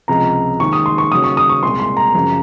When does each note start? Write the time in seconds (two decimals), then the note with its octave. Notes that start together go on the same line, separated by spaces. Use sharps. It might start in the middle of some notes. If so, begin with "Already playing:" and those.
0.08 C#2 C3 F3 A#5
0.60 D#2 D#3 G#3 C#6
0.73 D#6
0.86 C6
0.98 C#6
1.11 D#2 C#3 F#3 D#6
1.24 C#6
1.37 D#6
1.50 C#6
1.63 C2 A#2 G#3 C6
1.80 C6
1.97 A#5
2.14 F#2 C#3 F3